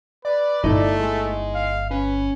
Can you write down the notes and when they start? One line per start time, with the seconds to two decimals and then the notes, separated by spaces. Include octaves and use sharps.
0.25 B4 D5
0.64 G1 A3 D#4 E4 D#5
1.00 G#3
1.55 F5
1.91 C#4 B4